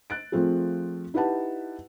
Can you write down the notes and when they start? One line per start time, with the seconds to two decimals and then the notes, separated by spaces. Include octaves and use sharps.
0.10 F#6 A6 D7
0.32 F3 A3 C4 F4 G#4
1.14 D#4 E4 G4 B4 F#5 A5